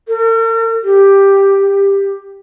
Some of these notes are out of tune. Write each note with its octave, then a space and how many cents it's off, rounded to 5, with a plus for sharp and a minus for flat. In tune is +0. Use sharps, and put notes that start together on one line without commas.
A#4 -45
G4 +5
G4 +15